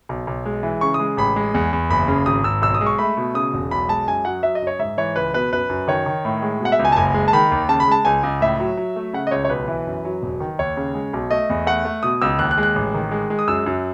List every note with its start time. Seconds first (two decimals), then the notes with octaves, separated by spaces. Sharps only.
0.09 B1
0.27 B1
0.45 G#3
0.63 E3
0.81 C#3 C#6
0.94 D#6
1.00 G#3
1.17 A1 B5
1.36 G#3
1.54 E2
1.73 E2
1.90 F#1 B5
2.08 C#3
2.26 G#1 D#6
2.44 G#1 E6
2.62 B1 E6
2.75 D#6
2.81 G#3
2.86 C#6
2.99 A3 B5
3.17 B2
3.34 C#3 D#6
3.54 E1
3.71 B1 B5
3.89 G#3 A5
4.07 F#2 G#5
4.25 F#3 F#5
4.43 F#3 E5
4.55 D#5
4.62 F#2
4.67 C#5
4.79 G#2 E5
4.98 E3 C#5
5.16 C#2 B4
5.34 B2 B4
5.52 F#2 B4
5.70 F#2
5.88 D#3 C#5
6.06 D#3
6.25 A2
6.42 G#3
6.61 B2 F#5
6.72 E5
6.79 C#2
6.85 G#5
6.92 A5
6.96 F#1 G#5
7.14 G#3
7.28 A5
7.33 D#3 B5
7.52 D#2
7.69 C#3 A5
7.80 B5
7.88 G#3 A5
8.05 C#2 G#5
8.23 C#2
8.41 A2 E5
8.59 F#3
8.77 F#3
8.96 A3
9.13 C#3 F#5
9.27 D#5
9.31 C#2 C#5
9.45 C#5
9.49 B1 B4
9.68 E3
9.87 F#2
10.05 F#3
10.22 E1
10.40 D#3
10.59 D#2 C#5
10.77 C#3
10.95 G#3
11.13 B1
11.31 A3 D#5
11.50 E2
11.67 A3 F#5
11.85 A3
12.03 B2 D#6
12.22 C#2 E6
12.39 D#2 F#6
12.51 F#6
12.57 G#3
12.63 F#6
12.76 A1
12.94 D#3
13.11 G#3
13.30 G#3
13.39 D#6
13.48 F#2 E6
13.66 F#2